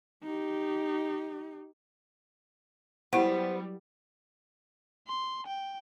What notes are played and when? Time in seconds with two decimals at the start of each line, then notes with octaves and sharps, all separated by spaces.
0.24 D#4 G4
3.13 F#3 G3 B3 E4 G4 C5 F#5
5.08 C6
5.47 G5